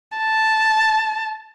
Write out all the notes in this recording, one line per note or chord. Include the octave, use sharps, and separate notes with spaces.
A5